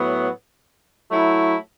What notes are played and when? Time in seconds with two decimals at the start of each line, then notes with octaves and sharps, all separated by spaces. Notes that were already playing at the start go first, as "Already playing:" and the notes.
Already playing: A2 F#3 B3
1.11 F#3 A3 E4